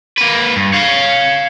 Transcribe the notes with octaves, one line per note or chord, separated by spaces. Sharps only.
A#3 B4
G2
C#5 F5